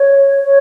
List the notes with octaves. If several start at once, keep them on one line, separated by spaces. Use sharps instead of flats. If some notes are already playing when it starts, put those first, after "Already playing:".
Already playing: C#5
C#5